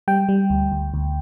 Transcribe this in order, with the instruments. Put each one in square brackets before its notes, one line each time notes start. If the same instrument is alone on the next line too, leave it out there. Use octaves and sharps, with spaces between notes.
[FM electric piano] G3 G5
G3
D2
D2
D2